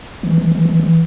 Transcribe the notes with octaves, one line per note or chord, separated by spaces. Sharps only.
E3
E3
E3
E3
E3